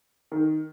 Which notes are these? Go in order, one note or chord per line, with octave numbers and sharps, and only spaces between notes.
D#3